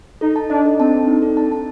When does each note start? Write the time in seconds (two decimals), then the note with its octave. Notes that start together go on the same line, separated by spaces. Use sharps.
0.21 D#4 A4
0.36 A5
0.50 D4 D#5
0.65 A4
0.80 C4 A5
0.94 A4
1.07 D#4
1.22 A4
1.37 A5
1.52 A5